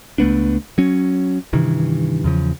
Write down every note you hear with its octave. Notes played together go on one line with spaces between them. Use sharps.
C#2 A3 B3 D4
F#3 C#4
G2 C3 D#3 E3
E2 C#3 F3